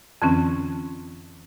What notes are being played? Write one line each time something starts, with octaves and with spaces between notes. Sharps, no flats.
F2 D3 E3 C4 C#4